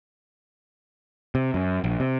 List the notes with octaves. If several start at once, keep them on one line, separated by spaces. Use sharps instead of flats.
C3
F#2
A#1
C3